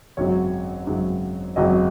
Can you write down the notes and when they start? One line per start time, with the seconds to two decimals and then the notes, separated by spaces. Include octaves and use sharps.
0.17 G#1 F#2 C#3 F#3 C#5
0.87 G#1 F#2 C#3 F#3
1.56 G#1 F#2 C#3 F#3 D#5